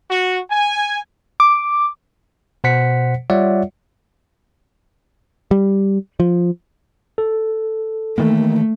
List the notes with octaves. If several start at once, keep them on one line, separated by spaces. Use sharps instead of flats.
F#4
G#5
D6
B2 C5 F#5 B6 C#7
G3 F4 C#5 D5 E5 F#5
G3
F3
A4
D#3 E3 A3 A#3